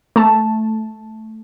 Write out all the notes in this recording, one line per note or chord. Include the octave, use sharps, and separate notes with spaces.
A3 A5